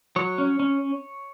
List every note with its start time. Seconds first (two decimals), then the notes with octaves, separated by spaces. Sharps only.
0.16 F#3 C#5
0.38 C#4
0.60 C#4